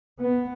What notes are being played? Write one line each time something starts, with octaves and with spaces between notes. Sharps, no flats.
B3